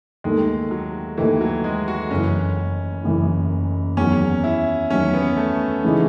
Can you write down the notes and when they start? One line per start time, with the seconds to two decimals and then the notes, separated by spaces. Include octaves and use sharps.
0.24 D#2 D#3 G#3 A3
0.71 F#3
1.17 D#2 D#3 E3 A3
1.41 F#3
1.64 G#3
1.88 F#4
2.11 F#1 F#2 E3 C#4
3.04 F#1 F#2 E3
3.97 E2 D#3 F#3 C#4
4.44 E4
4.90 E2 D#3 F#3 C#4
5.14 B3
5.37 A3
5.84 C#3 E3 G#3 D#4